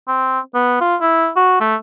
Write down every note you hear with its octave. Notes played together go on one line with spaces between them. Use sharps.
C4
B3
F4
E4
F#4
A3